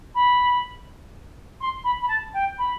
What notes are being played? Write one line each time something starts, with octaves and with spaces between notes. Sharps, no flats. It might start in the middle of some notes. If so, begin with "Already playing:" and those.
B5
C6
B5
B5
A5
G5
B5